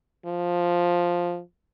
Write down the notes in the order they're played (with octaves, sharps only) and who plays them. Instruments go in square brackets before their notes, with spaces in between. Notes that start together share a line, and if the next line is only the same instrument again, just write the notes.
[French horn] F3